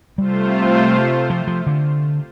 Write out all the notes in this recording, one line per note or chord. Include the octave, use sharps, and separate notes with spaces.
C3 G3 A3 F4 C5
F3
F3
D3